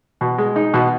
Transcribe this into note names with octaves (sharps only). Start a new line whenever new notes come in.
B2
G#3
D#4
B2